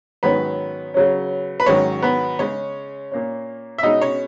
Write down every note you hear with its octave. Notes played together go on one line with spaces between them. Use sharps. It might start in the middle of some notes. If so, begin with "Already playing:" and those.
G#2 D#3 F#3 B3 C#4 B4
C#3 F#3 C#4
B4
G#2 D#3 F#3 C#4 C#5
B3 B4
C#3 G#3 C#4 C#5
A#2 A#3 C#4
E5
B2 G#3 C#4 D#4 D#5
C#4 C#5